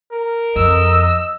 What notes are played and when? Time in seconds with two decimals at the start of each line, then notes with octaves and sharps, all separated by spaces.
0.12 A#4
0.56 F2 D#5 E6